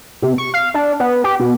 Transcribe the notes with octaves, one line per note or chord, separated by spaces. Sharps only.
C3
C#6
F5
D4
B3
G4
B2